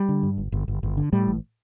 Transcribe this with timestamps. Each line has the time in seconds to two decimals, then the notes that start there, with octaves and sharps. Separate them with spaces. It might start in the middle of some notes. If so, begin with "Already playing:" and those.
Already playing: G3
0.09 D3
0.23 G2
0.38 G1
0.52 G1
0.68 G1
0.83 G1
0.97 D3
1.13 A2 G3
1.28 A1